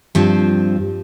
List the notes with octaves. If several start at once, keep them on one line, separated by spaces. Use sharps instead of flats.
G2 F3 C4